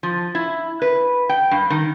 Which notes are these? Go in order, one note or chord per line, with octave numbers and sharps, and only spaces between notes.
F3
E4
B4
G5
G2
D#3